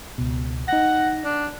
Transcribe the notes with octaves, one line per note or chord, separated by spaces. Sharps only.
C#2 B2
D#4 F#5 A#6
D4